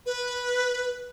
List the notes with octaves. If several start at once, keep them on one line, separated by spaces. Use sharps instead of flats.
B4